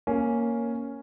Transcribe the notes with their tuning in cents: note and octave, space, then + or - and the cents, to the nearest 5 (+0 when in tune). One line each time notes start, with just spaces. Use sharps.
A#3 +0 C#4 +0